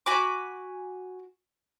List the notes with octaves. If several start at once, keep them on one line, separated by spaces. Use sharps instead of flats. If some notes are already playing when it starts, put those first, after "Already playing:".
F#4 G#5 B5 D6